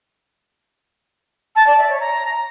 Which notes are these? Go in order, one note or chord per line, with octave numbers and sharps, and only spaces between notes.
A5
D5
E5
C#5
A#5